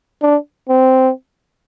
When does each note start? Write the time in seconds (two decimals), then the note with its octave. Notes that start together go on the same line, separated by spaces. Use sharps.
0.22 D4
0.69 C4